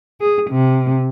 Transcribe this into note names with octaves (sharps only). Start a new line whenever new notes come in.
G#4
C3